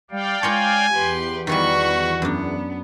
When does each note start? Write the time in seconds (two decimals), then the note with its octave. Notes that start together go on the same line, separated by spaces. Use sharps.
0.11 G3 D5 F5 G5
0.43 G#3 F4 A#4 C#5 G#5
0.92 E2 G4 B4 C6
1.47 D#3 E3 G3 F#4 B5 C#6
2.22 F#2 B3 D4